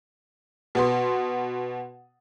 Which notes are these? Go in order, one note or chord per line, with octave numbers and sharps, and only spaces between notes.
B2 B3 C6